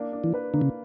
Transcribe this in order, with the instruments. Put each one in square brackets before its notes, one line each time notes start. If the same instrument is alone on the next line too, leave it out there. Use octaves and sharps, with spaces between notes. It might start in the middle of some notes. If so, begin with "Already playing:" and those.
Already playing: [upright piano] A#3 D4
D4
[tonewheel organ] E3
[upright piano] B4
[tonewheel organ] D3 [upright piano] A#3
[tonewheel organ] C#3